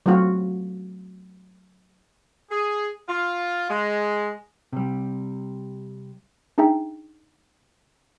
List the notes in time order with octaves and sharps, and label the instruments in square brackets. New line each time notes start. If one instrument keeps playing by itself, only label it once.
[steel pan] F#3 A3 C4 F4 F#4
[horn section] G#4
F4
G#3
[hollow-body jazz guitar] C3 G3
[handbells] D4 D#4 G#4 E5 G5 A#5